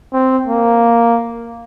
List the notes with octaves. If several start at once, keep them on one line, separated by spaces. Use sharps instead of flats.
C4
A#3